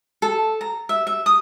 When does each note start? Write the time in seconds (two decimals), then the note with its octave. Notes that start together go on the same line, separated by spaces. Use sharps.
0.22 A4
0.61 A#5
0.89 E5
1.07 E5
1.26 D#6